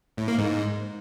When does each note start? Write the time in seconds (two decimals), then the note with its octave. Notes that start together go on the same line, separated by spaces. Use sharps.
0.17 A2
0.28 A#3
0.38 G#2